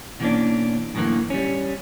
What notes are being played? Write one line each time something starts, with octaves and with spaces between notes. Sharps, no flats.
B2 E3 G3 A#3 C#4 D4
F#2 A2 D3 E3 A#3
G3 C#4